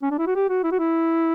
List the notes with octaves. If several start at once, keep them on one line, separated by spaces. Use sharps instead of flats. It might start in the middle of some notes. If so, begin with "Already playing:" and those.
C#4
D4
E4
F#4
G4
F#4
E4
F#4
E4